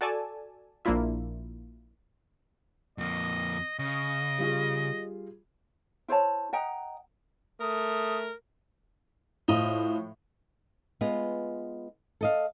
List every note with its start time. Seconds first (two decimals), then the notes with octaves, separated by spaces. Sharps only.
0.01 F#4 A4 D5 G#5 A5
0.85 A#1 A#3 D4 E4 F4 E5
2.98 F2 A#3 D#5
3.79 C#3 D#5
4.39 G3 F4 G#4
6.08 E4 C5 C#5 A5
6.53 D#5 F#5 G5 A#5
7.60 A3 A#4 D#6
9.48 A2 F3 D#5
11.01 G#3 B3 F4
12.21 A4 D#5 F5